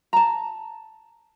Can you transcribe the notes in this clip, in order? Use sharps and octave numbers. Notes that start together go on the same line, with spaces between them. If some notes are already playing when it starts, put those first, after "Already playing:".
A5 A#5